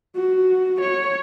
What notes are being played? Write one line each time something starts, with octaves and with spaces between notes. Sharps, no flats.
F#4
C#5